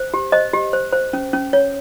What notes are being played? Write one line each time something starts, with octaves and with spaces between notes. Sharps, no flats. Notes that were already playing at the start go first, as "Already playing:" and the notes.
Already playing: C5
G4
C5 D#5
G4
C5
C5
C#4
C#4
C#5